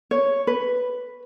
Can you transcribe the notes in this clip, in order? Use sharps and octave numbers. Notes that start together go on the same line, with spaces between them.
C#5
B4